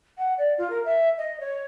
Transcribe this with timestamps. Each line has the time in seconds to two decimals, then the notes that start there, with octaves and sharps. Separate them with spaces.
0.18 F#5
0.38 D5
0.58 F4
0.70 A#4
0.85 E5
1.18 D#5
1.40 C#5